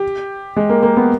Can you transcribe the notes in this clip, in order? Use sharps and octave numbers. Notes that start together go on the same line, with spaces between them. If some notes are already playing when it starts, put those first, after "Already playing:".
Already playing: G4
G#3
A#3
A#3
B3